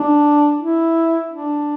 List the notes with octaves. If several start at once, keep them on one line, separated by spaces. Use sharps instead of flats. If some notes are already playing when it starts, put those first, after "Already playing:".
Already playing: D4
E4
D4